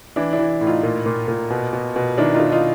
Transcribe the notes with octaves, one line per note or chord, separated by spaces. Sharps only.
E3 D4 E4
D4 E4
E3
A2
D#4 F4
A#2
A#2
A#2
B2
B2
B2
D#3 D4 E4
D#4 F4
D#3
D#4 F4